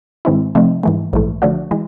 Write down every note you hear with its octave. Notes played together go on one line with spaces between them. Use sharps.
G#2 D#3 G#3 C4 E4
C3 F3 A3 C4 D#4
G#2 E3 A3
A#1 G#2 E3 A3
D3 F3 A3 D4 F#4
E3 G#3